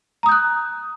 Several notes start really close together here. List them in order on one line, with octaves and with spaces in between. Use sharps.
A#5 D#6 G6 F#6